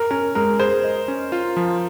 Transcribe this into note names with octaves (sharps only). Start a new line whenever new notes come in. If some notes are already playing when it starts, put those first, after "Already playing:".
Already playing: A#4
C#4 A#4
G#3 A#4
G#4 C5
D#5
C#4
F4
F3